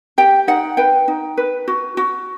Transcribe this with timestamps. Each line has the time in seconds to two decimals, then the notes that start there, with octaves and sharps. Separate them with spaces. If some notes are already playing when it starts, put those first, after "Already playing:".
0.18 G4 G5
0.48 D#4 F#5
0.77 B4 G5
1.08 D#4
1.37 B4
1.68 F#4
1.97 F#4